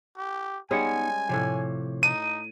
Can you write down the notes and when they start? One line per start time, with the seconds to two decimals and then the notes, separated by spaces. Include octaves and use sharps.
0.17 G4
0.71 G3 G#3 B3 C#4 D#4 F#5 G#5
1.29 A2 C3 F3 C#5 D5
2.03 D#4 D#7